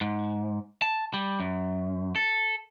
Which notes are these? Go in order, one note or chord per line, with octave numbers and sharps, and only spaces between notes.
G#2
A5
G3
F#2
A4